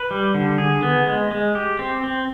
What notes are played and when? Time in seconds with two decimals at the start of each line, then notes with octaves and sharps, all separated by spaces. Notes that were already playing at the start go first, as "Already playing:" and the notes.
Already playing: B4
0.11 G3
0.34 D3
0.58 G#4
0.83 B3
1.07 G#3
1.31 G#3
1.55 G4
1.79 C4
2.04 C4